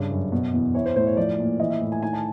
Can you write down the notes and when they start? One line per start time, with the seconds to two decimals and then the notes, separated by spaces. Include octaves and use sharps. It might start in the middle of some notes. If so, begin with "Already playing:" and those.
Already playing: G2 C#3 C#5
0.11 F#2
0.32 B2
0.54 E2
0.74 E3 C#5
0.86 C5
0.96 A2 C5
1.07 C#5
1.17 F3 D5
1.39 A#2
1.60 E3 D#5
1.70 E5
1.81 A2
1.92 G#5
2.03 D#3 G#5
2.13 A5